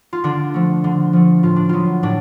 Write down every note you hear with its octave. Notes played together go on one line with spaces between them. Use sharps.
F4
D3 D4
F3 A3
D3
F3 A3
A2 F4
D4
F#3 B3 F4
A2 D4